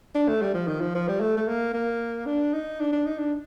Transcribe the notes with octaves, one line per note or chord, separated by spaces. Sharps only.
D4
A3
G3
F3
D#3
F3
F3
G3
A3
A3
A#3
A#3
D4
D#4
D4
D4
D#4
D4